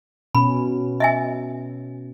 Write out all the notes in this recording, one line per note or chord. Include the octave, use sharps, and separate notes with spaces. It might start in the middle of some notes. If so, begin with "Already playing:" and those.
B2 C#4 B5
D#5 E5 G#5